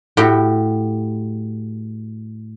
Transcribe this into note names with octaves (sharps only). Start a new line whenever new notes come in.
A2 F#4 G4 G5 B5